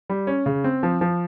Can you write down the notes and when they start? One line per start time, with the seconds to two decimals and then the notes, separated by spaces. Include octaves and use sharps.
0.09 G3
0.27 C#4
0.46 C#3
0.64 C4
0.83 F3
1.01 F3